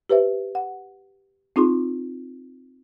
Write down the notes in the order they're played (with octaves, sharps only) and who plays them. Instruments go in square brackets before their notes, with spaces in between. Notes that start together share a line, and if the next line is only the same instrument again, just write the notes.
[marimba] G4 B4 C5 E5
F#5
C4 D#4 F4 G#4 C6